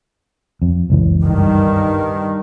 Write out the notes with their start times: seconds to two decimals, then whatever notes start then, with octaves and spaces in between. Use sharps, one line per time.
0.62 F2
0.90 F#1 C#2 E3
1.22 G2 D#3